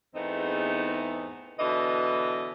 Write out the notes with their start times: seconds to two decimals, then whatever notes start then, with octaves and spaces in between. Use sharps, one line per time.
0.15 E2 G#2 A3 B3 C4 D#4
1.59 B2 D3 E3 D#5